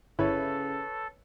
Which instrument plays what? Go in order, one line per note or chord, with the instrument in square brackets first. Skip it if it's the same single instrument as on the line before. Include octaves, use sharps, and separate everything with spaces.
[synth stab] G1 E4 [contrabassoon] C#3 [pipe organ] A4 [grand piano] B4 C#5